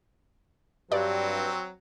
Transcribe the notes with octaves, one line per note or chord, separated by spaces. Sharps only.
G2 F#3 C4 D5